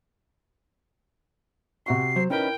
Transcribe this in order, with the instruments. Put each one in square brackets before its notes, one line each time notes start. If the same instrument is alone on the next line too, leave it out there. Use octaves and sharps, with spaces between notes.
[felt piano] C3 F#4 C#6 [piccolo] C7
[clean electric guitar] F#3 [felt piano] C5
[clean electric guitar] C#4 D#4 B4 [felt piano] E4 A#4 [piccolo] G5